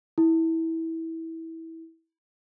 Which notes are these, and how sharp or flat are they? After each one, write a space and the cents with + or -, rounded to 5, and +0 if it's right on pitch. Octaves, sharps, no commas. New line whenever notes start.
E4 -20